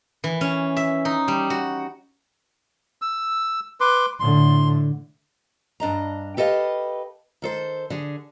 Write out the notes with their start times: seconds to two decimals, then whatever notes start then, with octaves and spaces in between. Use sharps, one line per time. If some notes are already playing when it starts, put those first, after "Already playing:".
0.24 E3
0.41 C#4
0.77 E5
1.05 D#4
1.28 G3
1.50 F#4
3.02 E6
3.81 B4 C6 D6
4.20 A2 D3 C6
5.80 G2 D4 D#5 A#5
6.37 G4 A4 B4 D#5 F5
7.42 D#3 A4 C5
7.90 D3 G#4